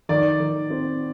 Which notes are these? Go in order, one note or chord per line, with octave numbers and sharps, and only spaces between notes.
D#3 D5
D#3
C4